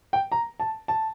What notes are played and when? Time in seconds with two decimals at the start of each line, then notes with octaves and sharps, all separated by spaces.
0.13 G5
0.32 A#5
0.60 A5
0.88 A5